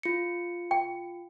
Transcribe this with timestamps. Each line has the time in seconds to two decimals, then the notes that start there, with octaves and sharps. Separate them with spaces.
0.03 F4 C#7
0.71 G5